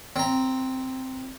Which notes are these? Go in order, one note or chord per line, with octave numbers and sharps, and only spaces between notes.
C4 A#5